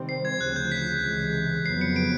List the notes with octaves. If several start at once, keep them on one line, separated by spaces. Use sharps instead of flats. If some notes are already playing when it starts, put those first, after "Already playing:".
Already playing: C3 D#3 G3 C4
C7
G#6
D2 C#3 F3 F#6
G6
B6
C#2 C3 E3 G#3
F2 C#3 F#3 B3 C7
C#7
D7